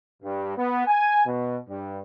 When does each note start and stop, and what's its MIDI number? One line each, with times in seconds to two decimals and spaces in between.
0.23 0.53 43
0.56 0.86 59
0.86 1.24 80
1.25 1.56 47
1.68 1.99 43